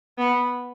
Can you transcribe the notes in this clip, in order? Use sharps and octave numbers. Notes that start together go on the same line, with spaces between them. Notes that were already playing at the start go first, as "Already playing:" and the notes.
B3